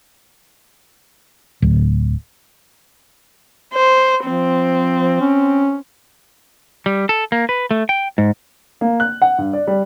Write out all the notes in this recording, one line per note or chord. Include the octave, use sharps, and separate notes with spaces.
D1
C5
F3 C4
C#4
G3
A4
A#3
B4
A3
G5
G#2
A#3
F#6
F#5
G2
D5
G3